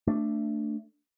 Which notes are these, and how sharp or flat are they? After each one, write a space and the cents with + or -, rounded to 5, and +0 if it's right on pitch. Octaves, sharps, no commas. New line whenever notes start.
A3 +15 D4 +0